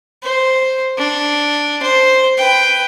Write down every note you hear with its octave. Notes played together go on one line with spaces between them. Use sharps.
C5
D4
C5
B4 G5